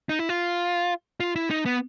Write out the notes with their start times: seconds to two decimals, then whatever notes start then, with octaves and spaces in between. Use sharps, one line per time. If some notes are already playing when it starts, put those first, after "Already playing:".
0.09 D#4
0.19 E4
0.29 F4
1.20 F4
1.36 E4
1.51 D#4
1.66 B3